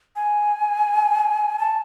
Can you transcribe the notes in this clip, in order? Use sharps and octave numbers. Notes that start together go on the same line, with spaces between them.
G#5
A5